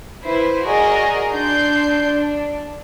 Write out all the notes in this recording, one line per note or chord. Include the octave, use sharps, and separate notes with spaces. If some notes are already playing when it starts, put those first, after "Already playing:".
E4 B4 C5
F#4 G#4 A#4 D5 D#5
D4 C6 G6
D4